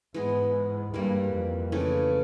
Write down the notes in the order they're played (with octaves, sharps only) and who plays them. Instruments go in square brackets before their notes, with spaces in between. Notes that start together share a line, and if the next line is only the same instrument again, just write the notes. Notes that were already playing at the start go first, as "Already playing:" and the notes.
[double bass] G#2 [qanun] E3 G#3 B3
[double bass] G2 [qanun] E3 G3 A#3
[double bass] F2
[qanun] C#3 E3 A3